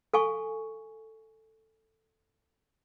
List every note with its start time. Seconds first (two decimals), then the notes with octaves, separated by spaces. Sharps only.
0.14 A4 F5 G#5 C#6